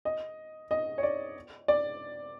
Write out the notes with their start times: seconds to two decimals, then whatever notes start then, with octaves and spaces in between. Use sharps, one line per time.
0.05 D#5
0.71 D#5
0.98 C#5
1.03 D5
1.68 D5